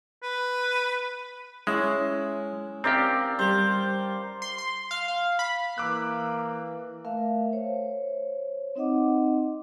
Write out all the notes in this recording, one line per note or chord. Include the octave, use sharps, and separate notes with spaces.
B4
G#3 C#4 E4
C4 G4 A#4 D5 F5
G3 C5
C6
C6
F5
F5
B5
E3 A#3 D6 E6 F#6
A3 A#4 E5 F5
C5 C#5
C4 D#4 D#5 F#5 D6